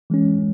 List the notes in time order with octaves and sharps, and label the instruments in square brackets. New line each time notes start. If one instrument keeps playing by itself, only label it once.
[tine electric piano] E3 G#3 C#4